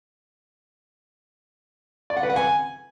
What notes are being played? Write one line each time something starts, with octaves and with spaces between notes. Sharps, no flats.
D5
F#5
B4
F#5
G#5